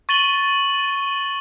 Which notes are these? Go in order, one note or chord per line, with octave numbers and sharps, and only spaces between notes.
C#6 A6 D#7 F#7 G7